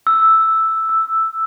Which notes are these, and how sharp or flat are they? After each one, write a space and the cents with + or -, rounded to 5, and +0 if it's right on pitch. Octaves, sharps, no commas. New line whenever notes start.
E6 +0
E6 +5